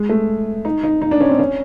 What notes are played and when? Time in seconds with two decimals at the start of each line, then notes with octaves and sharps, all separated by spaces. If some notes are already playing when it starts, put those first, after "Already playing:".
Already playing: G#3
0.09 A3
0.65 D#4
0.83 D#4
1.02 D#4
1.11 D4
1.21 C#4
1.29 C4
1.39 C#4